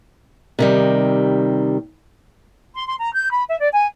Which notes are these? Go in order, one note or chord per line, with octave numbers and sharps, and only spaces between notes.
C3 D#3 G3
C6
C6
A#5
G6
B5
E5
D5
G#5